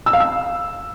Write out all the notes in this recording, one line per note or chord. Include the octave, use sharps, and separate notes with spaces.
E6
F5
E6